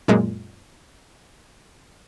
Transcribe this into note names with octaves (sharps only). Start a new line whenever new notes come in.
F#2 A#2 G#3